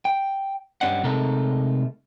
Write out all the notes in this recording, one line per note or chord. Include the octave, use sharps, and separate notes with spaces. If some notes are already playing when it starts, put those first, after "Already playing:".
G5
G2 G3 C#4 D#5 F#5
C3 G#3 A3 D#4 A4 A#4